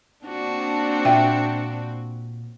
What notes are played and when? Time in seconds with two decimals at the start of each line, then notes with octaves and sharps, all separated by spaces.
0.25 A#3 C4 D4 F#4
1.05 A#2 E5 G5